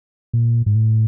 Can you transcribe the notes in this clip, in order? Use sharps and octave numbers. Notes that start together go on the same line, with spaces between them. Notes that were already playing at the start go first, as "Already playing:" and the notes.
A#2
G#2
A2